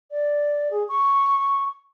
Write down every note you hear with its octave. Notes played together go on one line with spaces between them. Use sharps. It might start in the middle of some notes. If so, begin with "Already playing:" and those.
D5
G#4
C#6